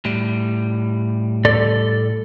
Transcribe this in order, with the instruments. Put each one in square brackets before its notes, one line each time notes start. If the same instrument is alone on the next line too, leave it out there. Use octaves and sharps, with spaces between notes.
[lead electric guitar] A2 G3
[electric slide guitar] A4 D5